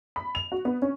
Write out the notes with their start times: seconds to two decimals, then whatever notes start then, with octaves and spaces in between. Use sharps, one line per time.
0.16 B5
0.35 F7
0.52 F#4
0.65 B3
0.82 C#4